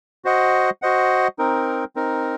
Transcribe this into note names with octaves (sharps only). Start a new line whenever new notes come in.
F#4 C5 D#5 F#5
F#4 C5 D#5 F#5
C4 D#4 A#4
C4 D#4 A#4